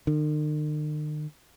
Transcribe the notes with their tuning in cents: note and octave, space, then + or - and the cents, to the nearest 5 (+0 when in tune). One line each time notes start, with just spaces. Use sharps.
D#3 -45